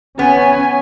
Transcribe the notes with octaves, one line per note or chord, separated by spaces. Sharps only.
B3 C#4 G#5